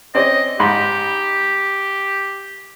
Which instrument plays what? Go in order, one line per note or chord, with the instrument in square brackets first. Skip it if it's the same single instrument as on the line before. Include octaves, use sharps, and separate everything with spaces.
[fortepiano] C4 C#4 D5 [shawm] D#5
[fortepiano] G#2 B5 C6 [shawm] G4